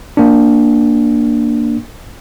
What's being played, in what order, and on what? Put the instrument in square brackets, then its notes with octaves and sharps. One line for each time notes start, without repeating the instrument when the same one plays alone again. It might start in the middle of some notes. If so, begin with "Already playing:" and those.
[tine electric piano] A#3 D4